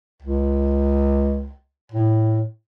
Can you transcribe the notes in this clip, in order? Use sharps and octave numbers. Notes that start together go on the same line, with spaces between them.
C#2
A2